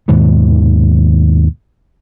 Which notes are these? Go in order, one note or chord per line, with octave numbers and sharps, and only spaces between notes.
D#2 G#2 B2 D#3